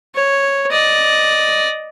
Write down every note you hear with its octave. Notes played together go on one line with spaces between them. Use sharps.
C#5
D5 D#5